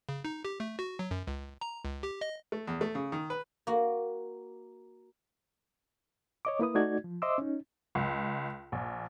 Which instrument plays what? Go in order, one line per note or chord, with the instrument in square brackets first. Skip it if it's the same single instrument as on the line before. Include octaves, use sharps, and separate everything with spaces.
[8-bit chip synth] C#3
D#4
G4
A3
F#4
F#3
F#2
C#2
A#5
C#2
G4
D#5
[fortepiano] A3
E2
A3
C#3
D#3
B4
[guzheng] A#3 F#4
[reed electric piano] C#5 D#5 D6
A#3 E4 B4 D#6
A3 D#4 F#4 D5 G#6
F3
C5 D#5 E5 C6 D6 E6
C#4 D#4
[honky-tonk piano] C#2
A#1